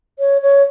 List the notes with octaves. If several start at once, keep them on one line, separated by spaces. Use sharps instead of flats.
C#5
C#5